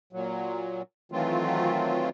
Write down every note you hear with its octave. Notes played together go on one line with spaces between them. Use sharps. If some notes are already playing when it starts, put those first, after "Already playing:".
A#2 F#3
D#3 E3 F#3 A3 C4 F4